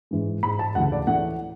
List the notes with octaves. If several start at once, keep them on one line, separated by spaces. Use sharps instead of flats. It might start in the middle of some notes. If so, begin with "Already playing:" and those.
G#2 E3 G#3
G#2 G#3 B5
A5
D2 C#3 E3 F#5
D5
A2 E3 A3 F#5